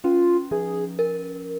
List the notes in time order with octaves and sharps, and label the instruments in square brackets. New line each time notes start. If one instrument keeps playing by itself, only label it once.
[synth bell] C#4 [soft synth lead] F4
[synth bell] F3 [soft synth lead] G#4
[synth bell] A#4